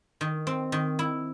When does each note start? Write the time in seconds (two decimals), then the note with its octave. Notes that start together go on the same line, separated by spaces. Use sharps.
0.21 D#3
0.47 C4
0.72 D#3
0.99 E4